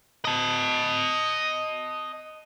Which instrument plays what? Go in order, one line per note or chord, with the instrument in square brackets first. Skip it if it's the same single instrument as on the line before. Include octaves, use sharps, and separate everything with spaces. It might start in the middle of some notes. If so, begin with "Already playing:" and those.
[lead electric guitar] D#5 A5